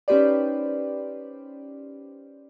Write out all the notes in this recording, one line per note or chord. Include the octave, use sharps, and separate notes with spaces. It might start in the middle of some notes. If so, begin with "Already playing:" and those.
C#4 D#4 G4 B4 C5 D5